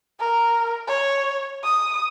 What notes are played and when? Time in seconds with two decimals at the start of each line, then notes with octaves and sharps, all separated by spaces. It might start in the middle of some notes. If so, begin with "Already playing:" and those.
0.20 A#4
0.88 C#5
1.64 D#6